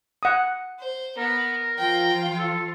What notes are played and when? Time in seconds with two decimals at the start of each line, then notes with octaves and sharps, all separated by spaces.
0.23 F#5 D#6
0.79 C5
1.17 B3 A#4
1.78 F3 F4 G5
2.38 A4